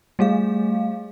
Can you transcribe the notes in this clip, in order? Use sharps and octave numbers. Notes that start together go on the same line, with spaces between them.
G3 A3 G#4 F5